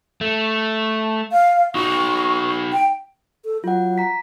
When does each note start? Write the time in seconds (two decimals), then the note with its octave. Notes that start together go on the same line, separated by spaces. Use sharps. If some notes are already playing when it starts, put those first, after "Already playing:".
0.21 A3
1.32 F5
1.75 D#4 F#4 C#6
2.73 G5
3.45 A4
3.64 F#3 F4 F#5
3.98 A#5 B6